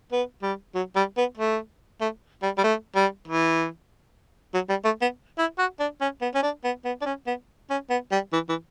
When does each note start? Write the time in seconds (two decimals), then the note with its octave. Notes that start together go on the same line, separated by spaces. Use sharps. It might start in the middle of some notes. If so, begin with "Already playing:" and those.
0.12 B3
0.43 G3
0.75 F#3
0.96 G3
1.18 B3
1.38 A3
2.01 A3
2.43 G3
2.58 G3
2.64 A3
2.96 G3
3.28 E3
4.54 F#3
4.70 G3
4.85 A3
5.01 B3
5.38 E4
5.59 F#4
5.80 D4
6.01 C#4
6.22 B3
6.35 C#4
6.43 D4
6.64 B3
6.85 B3
7.02 D4
7.06 C#4
7.27 B3
7.70 C#4
7.90 B3
8.12 G3
8.33 E3
8.49 E3